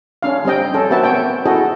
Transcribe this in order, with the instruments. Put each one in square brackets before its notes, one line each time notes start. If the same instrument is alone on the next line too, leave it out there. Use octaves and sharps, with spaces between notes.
[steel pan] C#4 D4 F5
G3 C4 D#5 G5
C#4 A4
A#3 C4 F#4 B4 E5 A5
B3 C#4 C#5 G5
E4 F#4 G#4 A4 D#5